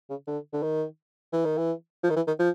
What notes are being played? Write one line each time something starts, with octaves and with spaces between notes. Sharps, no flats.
C#3
D3
D3
D#3
E3
D#3
E3
F3
D#3
E3
D#3
F3